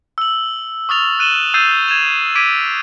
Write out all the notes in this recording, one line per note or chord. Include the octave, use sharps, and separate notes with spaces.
E6 F#7
C#6 D#6 F6 A6 F7
F#6 D#7 E7 F#7 G7
D#6 E6 G6 A6 C7 D#7
G#6 E7 F7
D6 G#6 B6 D7 D#7